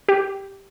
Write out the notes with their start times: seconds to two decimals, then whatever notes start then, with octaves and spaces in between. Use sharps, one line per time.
0.09 G4